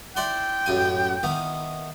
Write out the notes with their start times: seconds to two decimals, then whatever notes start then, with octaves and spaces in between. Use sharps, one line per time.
0.16 E4 D5 G5 C6
0.66 A1 F#2 G#5
1.23 D#3 E3 B3